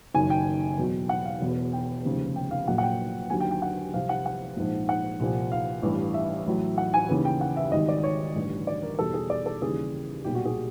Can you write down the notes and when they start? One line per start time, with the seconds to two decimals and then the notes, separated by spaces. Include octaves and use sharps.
0.14 F#1 F#2 D#3 G#5
0.30 G5
0.78 E2 B2 F#3
1.09 F#5
1.25 F5
1.41 E1 E2 B2
1.73 G5
2.05 F1 D#2 C#3 F3
2.36 G5
2.51 F5
2.68 A#1 A#2 F#3 F#5
2.78 F#5
2.83 G5
3.30 D#2 D3 F#3 G#5
3.40 G5
3.51 G5
3.62 F#5
3.94 C2 C3 F3 F5
4.09 F#5
4.26 F#5
4.56 A#1 G#2 F3
4.89 F#5
5.20 C2 A#2 F3
5.52 F5
5.82 A1 G2 E3
6.14 E5
6.46 A1 A2 F#3
6.78 F#5
6.94 G#5
7.09 D#2 C#3 E3
7.25 G5
7.41 F#5
7.57 E5
7.72 G#1 G#2 D#3 G3 D#5
7.89 D5
8.03 C#5
8.35 A1 G2 D3
8.67 D5
8.83 A#4
8.99 E2 B2 G3 A4
9.14 G#4
9.30 D5
9.46 A4
9.61 D#2 C#3 E3 G3 G#4
10.24 B1 A#2 G3 G4
10.35 F#4
10.46 G#4